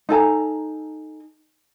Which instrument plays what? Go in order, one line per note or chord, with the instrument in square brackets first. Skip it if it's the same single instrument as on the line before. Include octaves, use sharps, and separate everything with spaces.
[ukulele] D#4 A4 G#5 A#5